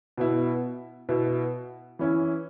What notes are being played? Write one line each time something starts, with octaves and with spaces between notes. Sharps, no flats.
B2 B3 E4
B2 B3 E4
E3 C#4 E4